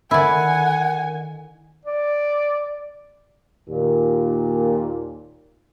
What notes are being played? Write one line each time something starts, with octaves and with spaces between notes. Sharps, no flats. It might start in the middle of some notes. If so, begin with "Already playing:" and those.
D3 D#3 E4 D5 F#5 G#5
D5
D#2 A#2